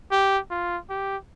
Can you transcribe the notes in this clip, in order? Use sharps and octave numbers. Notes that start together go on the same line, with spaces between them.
G4
F4
G4